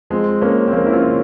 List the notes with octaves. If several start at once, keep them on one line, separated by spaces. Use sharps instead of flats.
F3 G#3 C4
F2 A#3 C#4
C4
F2 A#3 C#4
E4
C#4 F4
C#3